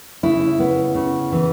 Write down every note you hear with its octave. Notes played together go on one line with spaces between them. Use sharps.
C#3 E4
B3
C#3
E3